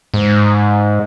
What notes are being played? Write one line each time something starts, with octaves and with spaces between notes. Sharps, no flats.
G#2